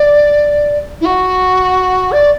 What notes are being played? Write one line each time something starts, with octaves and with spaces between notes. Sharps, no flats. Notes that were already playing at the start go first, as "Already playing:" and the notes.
Already playing: D5
E4
F#4
D5